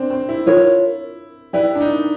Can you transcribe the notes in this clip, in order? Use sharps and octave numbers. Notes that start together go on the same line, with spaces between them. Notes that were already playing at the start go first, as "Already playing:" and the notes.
Already playing: C4 D4
C4
E4
F4 A#4 C#5
E4 G4 B4 D5 G5
D4
D#4